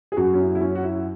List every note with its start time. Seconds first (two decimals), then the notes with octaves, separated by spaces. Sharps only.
0.12 G#4
0.17 F#2 F#3 F#4
0.34 C#4
0.38 E4
0.55 E4
0.61 C#4
0.75 F#4
0.83 E4